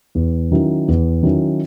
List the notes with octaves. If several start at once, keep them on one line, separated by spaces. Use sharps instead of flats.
E2
D#3 F#3 C#4 E4
E2
D#3 F#3 C#4 E4